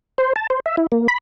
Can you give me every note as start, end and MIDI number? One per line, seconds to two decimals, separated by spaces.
0.18 0.33 72
0.36 0.47 81
0.50 0.60 72
0.66 0.76 76
0.77 0.87 64
0.92 1.07 58
1.08 1.18 83